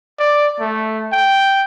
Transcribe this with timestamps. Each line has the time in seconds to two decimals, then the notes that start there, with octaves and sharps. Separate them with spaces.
0.19 D5
0.60 A3
1.13 G5